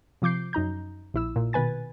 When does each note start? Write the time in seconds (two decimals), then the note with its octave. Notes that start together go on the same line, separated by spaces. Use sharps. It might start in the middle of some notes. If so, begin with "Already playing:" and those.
0.22 C3 F3 D6 G6 C7
0.53 F#2 D#4 A#5 G6
1.14 A#1 E4 E6
1.36 A#2
1.53 B2 D#3 B4 G#5 A6